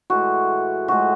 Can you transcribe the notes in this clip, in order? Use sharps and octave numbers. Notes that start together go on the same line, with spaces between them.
A2 E3 G#3 F#4
A2 F3 G#3 F#4